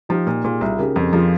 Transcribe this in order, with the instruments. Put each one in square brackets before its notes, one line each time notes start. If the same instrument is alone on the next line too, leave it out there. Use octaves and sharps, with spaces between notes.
[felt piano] F3 [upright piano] D#4 G4
[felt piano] A#2
[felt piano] A#2 [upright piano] F4 G#4
[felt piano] C2
[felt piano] C#3 [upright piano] G4 A#4
[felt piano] F2
[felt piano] F3 [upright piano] F4 G#4